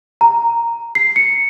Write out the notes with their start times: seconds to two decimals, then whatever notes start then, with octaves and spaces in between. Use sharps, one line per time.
0.21 A#5
0.95 C7
1.16 C#7